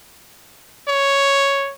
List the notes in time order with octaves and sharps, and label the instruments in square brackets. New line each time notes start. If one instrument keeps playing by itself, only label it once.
[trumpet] C#5